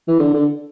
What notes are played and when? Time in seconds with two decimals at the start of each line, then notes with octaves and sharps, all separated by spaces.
0.08 E3
0.20 D3
0.33 D3